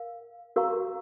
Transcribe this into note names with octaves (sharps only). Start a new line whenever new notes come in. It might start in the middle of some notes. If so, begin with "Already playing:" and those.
Already playing: A#4 F5
F#4 A#4 F5 A#5 C#6